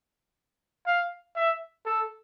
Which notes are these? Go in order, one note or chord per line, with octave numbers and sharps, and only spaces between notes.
F5
E5
A4